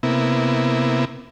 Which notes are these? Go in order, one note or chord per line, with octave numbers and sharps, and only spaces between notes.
C3 A#3 B3 E4